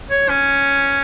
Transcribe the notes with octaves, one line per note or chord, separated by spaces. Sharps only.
C#5
C#4